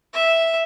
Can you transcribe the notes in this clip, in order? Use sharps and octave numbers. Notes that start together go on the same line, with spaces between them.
E5